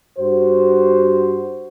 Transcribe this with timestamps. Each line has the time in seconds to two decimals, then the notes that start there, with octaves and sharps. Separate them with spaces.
0.19 G2 F#4 C5